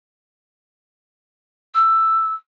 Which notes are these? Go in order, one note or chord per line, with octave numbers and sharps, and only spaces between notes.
E6